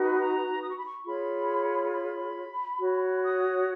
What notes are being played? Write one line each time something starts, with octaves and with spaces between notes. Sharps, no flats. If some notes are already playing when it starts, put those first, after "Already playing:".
Already playing: D#4 F#4 B4
A#5
D#6
C#6
B5
C#6
F4 G#4 C#5 B5
B5
F#4 C#5
D#6